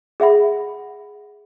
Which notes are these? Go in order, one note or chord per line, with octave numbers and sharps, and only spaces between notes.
G#4 E5 F#5 B5